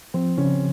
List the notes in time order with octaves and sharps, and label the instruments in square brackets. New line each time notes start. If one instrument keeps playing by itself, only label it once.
[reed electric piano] F3 [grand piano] C4
[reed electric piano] C#3 [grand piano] C#4